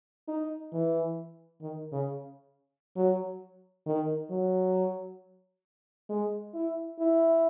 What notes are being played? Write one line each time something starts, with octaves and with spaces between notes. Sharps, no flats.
D#4
E3
D#3
C#3
F#3
D#3
F#3
G#3
E4
E4